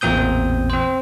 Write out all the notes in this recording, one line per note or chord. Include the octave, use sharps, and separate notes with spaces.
A1 E2 A#2 C4 D#6 G6
C4 C5